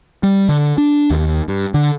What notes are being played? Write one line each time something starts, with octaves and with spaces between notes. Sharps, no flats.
G3
D3
D4
D#2
G2
D3